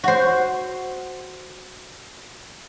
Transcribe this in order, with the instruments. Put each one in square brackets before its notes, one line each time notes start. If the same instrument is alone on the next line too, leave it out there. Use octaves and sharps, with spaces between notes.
[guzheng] F#4 C5